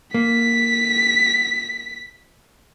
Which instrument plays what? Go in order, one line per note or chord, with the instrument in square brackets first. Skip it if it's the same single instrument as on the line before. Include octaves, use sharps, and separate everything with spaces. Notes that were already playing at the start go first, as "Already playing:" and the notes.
[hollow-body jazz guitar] A#3 [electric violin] B6